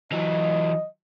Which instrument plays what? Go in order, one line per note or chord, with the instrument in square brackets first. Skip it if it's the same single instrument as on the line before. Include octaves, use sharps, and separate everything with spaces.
[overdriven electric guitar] E3 F#3 [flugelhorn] D#5